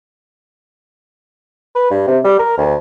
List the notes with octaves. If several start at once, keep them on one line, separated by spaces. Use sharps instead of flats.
B4
G2
C3
G3
A#4
D2